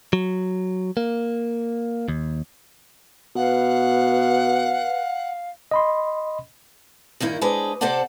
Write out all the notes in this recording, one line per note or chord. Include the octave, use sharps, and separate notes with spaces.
F#3
A#3
D#2
B2 B4 F5 F#5
D#5 B5 C6
G2 D#3 A#3 E4
G#3 D4 G#4 B4 C5
C3 A4 C5 D5 F#5 A5